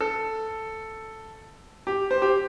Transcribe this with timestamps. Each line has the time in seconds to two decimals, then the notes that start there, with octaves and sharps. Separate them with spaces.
0.01 A4
1.87 G4
2.11 C5
2.22 G4